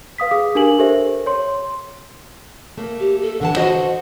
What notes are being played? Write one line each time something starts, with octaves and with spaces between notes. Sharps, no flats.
B4 F5 D#6 B6
G#4 F5 D6 D#6
D4 G4 A#4 G#5 F#7
G4 A4 A#4 C5 E5
C#5 C6
A3 A#3
G4
A4
D3 E3 F#5 A5
F#4 C5 D#5 F#5